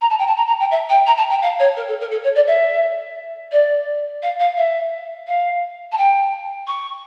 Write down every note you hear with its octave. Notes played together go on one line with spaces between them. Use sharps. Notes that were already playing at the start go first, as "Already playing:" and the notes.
A#5
A5
G5
A5
A#5
A#5
G5
E5
G5
A#5
A5
G5
F5
C#5
A#4
A4
A#4
A4
C#5
D5
E5
D5
F5
F5
E5
F5
A5
G5
C#6